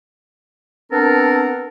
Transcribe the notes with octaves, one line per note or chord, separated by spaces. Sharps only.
B3 C4 D4 A4 A#4